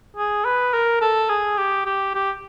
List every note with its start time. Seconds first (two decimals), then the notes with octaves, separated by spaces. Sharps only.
0.17 G#4
0.45 B4
0.74 A#4
1.01 A4
1.29 G#4
1.58 G4
1.85 G4
2.15 G4